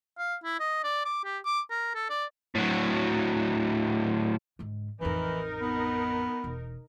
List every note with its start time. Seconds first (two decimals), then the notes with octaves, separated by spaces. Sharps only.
0.18 F5
0.44 E4
0.60 D#5
0.84 D5
1.05 D6
1.24 G4
1.45 D6
1.71 A#4
1.95 A4
2.10 D5
2.55 A2 F#3
4.59 G#2 D3
5.01 A1 F2 E3 D#4 A#4
5.61 B3
6.44 E1